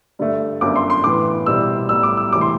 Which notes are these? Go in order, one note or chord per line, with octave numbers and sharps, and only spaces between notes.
G2 D3 A3
G1 F#2 D3 A3 D6
C6
C6
A2 E3 B3 D6
C2 B2 G3 C4 E4 E6
B1 A2 G3 E6
D6
E6
E1 D2 C3 E3 D6
C6